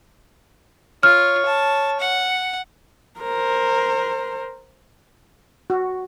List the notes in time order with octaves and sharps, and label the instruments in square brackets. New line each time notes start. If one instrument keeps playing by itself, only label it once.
[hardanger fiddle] F4 [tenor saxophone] C#5 [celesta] F6
[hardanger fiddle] A5
F#5
[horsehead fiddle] A#4 C5
[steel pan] F#4